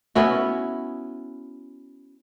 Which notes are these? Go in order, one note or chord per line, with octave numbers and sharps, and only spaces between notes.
B3 C#4 E4 F#4